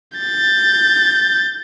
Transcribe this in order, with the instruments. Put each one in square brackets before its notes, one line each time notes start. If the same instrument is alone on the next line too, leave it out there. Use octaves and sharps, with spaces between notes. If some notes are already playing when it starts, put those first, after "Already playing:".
[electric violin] G6 A6